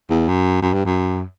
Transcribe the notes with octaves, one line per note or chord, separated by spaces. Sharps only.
E2
F#2
F#2
G2
F#2